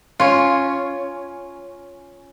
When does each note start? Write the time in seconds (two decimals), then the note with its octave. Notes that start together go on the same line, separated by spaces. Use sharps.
0.20 C#4 F4